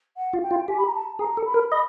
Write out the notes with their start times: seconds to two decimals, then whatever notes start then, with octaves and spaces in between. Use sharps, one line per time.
0.17 F#5
0.33 F4
0.42 G5
0.51 F4
0.68 G4 G#5
0.78 B5
0.87 A#5
0.94 A5
1.19 G#4 A#5
1.37 A4
1.45 B5
1.54 A#4
1.71 D#5 B5